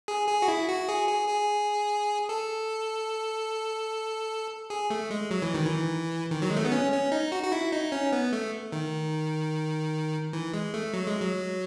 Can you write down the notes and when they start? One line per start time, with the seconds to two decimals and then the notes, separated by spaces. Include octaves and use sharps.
0.08 G#4
0.28 G#4
0.42 F#4
0.48 E4
0.69 F#4
0.89 G#4
1.09 G#4
1.28 G#4
2.29 A4
4.70 G#4
4.90 A3
5.10 G#3
5.31 F#3
5.42 E3
5.54 D#3
5.66 E3
6.31 D#3
6.42 F#3
6.50 G#3
6.57 A3
6.65 B3
6.72 C#4
6.92 C#4
7.12 D#4
7.32 F#4
7.43 F#4
7.52 E4
7.72 D#4
7.92 C#4
8.12 B3
8.33 A3
8.72 D#3
10.33 E3
10.54 G#3
10.74 A3
10.94 F#3
11.07 G#3
11.20 F#3